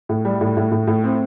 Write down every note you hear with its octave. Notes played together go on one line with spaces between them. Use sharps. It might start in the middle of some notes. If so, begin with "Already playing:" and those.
A2
G3
A2
A2
A2
A2
C4